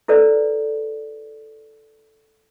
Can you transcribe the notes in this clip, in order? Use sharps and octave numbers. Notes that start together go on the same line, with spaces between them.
E4 A4 B4 D5